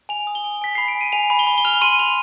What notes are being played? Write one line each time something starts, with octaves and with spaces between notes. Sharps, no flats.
G#5 F7
D#6
G7
G#5
G#5 B6
B5 C7
D7
G#5
D#7
G#5 F7
B5
G7
B5
G7
F6 F7
C6 D#7
C6 F7